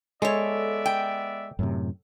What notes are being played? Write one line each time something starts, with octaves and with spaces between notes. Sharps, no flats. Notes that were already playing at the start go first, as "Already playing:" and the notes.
G#3 B3 A4 C#5 D5 E5
G5
F#2 A2 C3